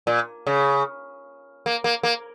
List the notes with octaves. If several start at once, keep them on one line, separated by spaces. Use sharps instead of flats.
A#2
C#3
A#3
A#3
A#3